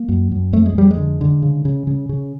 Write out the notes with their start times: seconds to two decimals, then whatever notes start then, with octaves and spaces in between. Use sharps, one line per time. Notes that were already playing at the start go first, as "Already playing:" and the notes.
Already playing: A#3
0.09 F#2
0.32 F#2
0.53 F2 A3
0.66 G#3
0.76 F2 G3
0.91 G#3
0.97 D3
1.21 D3
1.42 C#3
1.65 C#3
1.87 C#3
2.09 C#3